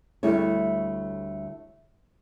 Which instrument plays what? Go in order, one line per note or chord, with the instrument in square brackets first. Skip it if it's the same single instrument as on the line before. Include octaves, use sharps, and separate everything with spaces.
[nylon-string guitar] D2 G3 A3 E4 C#5